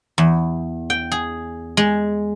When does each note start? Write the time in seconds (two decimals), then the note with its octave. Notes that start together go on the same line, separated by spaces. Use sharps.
0.18 E2
0.90 G5
1.12 G#4
1.77 G#3